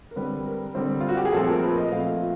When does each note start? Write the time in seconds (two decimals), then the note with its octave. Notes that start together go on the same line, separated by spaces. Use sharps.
0.11 A#4
0.16 D3 G3 C4 B4
0.46 A#4
0.75 D3 G3 C4
1.01 F4
1.09 F#4
1.17 G4
1.25 G#4
1.33 A#2 F3 A3 C4 A4
1.48 A#4
1.62 B4
1.78 D#5
1.92 A#2 F3 A3 C4 F5